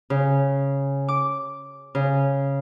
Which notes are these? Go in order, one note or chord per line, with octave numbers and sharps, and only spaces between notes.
C#3
D6
C#3